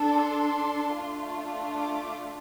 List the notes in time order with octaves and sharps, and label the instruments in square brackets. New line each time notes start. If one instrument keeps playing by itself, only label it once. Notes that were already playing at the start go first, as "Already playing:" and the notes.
Already playing: [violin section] D4 A4
C6
A3 D4 F4
D6